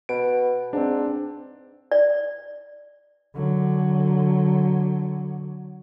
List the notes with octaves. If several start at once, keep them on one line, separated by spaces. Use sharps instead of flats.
B2 D7
G#2 C4 D4
D5
D3 F#3